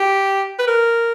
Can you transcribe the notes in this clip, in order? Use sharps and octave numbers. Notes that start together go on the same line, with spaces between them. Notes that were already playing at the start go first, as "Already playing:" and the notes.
Already playing: G4
B4
A#4